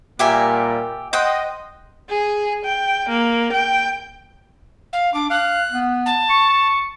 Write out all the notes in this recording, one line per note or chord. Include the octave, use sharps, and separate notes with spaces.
A#2 G3 A#3 G4 E5 G#5
C5 D#5 F#5 G5
G#4
G5
A#3
G5
F5
D4 D6
F5 F#6
B3
A5
C#6